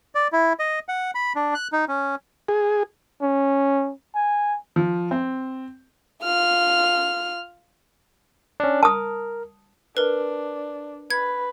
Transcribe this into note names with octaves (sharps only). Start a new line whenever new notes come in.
D5
E4
D#5
F#5
B5
D4
F#6
D#4
C#4
G#4
C#4
G#5
F3
C4
F4 F6
C#4 D4
A#4 A5 D#6
D4 A#4 B4
B4 G#6